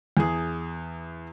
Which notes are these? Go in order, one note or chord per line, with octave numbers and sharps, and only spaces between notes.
E2 G#4